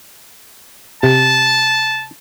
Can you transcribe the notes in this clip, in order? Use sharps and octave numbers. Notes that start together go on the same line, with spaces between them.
C3 A5